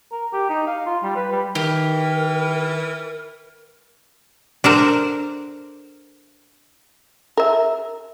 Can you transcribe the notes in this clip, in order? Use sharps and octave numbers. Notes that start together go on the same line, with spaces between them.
A#4
G4
D#4
F5
F4
G3
B4
G3
D#3 E3 G4 A#4
D4 A4 A#4 C5
A#4 E5